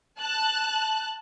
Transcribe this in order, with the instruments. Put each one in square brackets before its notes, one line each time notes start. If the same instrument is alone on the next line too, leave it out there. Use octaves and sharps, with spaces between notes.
[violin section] A5 F#6